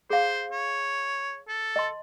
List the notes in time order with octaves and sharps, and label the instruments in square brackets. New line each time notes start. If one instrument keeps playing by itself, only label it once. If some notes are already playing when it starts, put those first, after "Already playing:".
[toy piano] G#4 F5 [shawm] C5
[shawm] C#5
A4
[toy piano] D#5 A5 C6